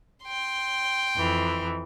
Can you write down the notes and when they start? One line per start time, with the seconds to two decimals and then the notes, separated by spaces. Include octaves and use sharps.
0.25 G5 C6
1.17 F2 E3